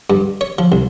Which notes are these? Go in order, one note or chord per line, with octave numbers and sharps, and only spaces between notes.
G2
C#5
F3
C2